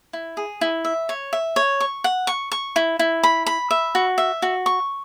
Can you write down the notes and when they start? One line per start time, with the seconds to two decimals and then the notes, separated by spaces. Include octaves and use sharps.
0.13 E4
0.37 G#4
0.61 E4
0.85 E5
1.09 C#5
1.33 E5
1.56 C#5
1.80 C#6
2.04 F#5
2.27 C#6
2.52 C#6
2.76 E4
2.99 E4
3.23 B5
3.46 B5
3.71 E5
3.95 F#4
4.18 E5
4.42 F#4
4.66 C#6